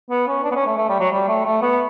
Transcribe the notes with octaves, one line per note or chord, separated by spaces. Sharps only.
B3
C#4
D4
B3
C#4
A3
A3
G3
F#3
G3
A3
A3
B3